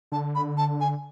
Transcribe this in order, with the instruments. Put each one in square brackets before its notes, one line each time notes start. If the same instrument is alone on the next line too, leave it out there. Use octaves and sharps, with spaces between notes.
[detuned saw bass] D3 [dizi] A5
[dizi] B5
A5
G#5